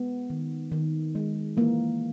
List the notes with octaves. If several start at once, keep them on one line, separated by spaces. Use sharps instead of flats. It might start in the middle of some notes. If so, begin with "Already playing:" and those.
Already playing: G#3 B3
D#3
D#3
G#3
E3 A#3